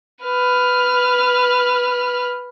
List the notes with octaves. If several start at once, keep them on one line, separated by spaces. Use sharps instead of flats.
B4 F6